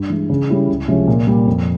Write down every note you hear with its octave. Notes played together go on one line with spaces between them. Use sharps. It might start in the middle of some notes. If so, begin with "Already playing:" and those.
Already playing: G2
E3 G#3
C#3
G3 C#4 E4 G4
C#2
C3 F3 G#3 C#4
A#2
G3 A#3
F2